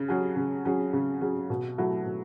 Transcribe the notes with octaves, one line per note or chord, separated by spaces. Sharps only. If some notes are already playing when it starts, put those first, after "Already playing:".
Already playing: C#3
F#3 C#4 G#4
C#3
F#3 C#4 G#4
C#3
F#3 C#4 G#4
B2
F#3 A3 E4
B2